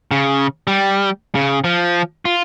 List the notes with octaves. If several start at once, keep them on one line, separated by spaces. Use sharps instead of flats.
C#3
G3
C#3
F3
F4